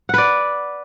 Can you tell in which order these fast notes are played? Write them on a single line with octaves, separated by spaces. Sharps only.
F#5 B4 D5